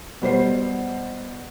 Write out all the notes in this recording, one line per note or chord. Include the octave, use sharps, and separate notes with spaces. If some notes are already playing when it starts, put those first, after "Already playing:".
B2 G3 C5 C7